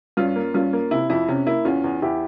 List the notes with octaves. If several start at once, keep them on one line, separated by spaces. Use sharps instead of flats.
G2 C#4 F4
A#3
G2 C#4 F4
A#3
C3 E4
F2 E4
C3 C#4
A#3 E4
E2 C#4 F4
E2
E2 E4 G4